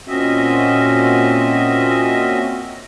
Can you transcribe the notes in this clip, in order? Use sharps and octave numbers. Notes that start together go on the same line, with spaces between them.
A#2 C4 C#4 F#4 D#5 E5